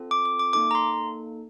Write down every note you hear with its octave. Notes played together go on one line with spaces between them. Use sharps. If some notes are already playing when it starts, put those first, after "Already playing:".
Already playing: C4 F4 A4
D6
D6
D6
A#3 D#4 A4 D6
A#5
C6